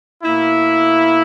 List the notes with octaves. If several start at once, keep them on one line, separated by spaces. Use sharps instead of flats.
B2 A#3 E4